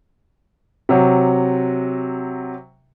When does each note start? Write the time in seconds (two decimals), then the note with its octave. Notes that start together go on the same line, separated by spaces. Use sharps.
0.89 C3 F#3